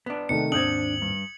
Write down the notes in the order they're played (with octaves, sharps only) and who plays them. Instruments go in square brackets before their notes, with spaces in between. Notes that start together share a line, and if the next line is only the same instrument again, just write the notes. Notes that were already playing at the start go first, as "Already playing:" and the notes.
[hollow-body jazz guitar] B3 D4
[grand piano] C3 D#3 A3 [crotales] C#7
[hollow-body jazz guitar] D#2 G#2 C4 [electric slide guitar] D4 [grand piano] D#6 G6 G#6 [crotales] F#7
[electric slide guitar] G2